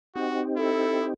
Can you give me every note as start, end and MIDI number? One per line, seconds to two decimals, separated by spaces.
0.15 1.14 60
0.15 1.14 63
0.15 0.41 66
0.15 1.14 67
0.57 1.06 64
0.57 1.07 69